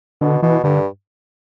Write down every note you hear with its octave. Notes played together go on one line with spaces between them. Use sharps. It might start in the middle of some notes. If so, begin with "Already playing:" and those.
B2 D3
B2 E3
G2 D3